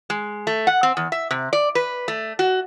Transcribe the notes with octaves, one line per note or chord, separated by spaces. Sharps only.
G#3
A3
F#5
C4
E2
E5
C3
D5
B4
A3
F#4